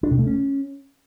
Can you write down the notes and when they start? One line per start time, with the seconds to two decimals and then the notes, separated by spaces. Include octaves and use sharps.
0.03 D4
0.11 C3
0.19 A3
0.27 C#4